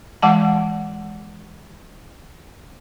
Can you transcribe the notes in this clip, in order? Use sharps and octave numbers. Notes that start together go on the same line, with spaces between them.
E3 G#3 F#5 A5